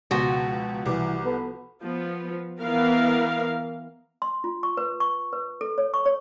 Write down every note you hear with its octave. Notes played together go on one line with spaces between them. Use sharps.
C#2 B2 F3 F#4
C2 E3 D6
B3 A4 B4
F3 B3
E3 B3 A#4 F5
C6
F4
C#6
B4
C#6
B4
A4
C#5
C#6
C#5